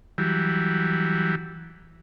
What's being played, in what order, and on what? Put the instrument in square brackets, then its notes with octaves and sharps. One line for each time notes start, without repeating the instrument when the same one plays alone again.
[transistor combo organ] E3 F#3 G3